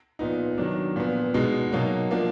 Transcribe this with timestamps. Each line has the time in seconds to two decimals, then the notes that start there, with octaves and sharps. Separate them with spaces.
0.19 A#2 F3 B3 D#4
0.58 D#3 F#3 D4
0.96 A#2 F3 B3
1.34 B2 G#3 D#4
1.72 B2 F#3 A#3 D#4
2.11 F3 A#3 D4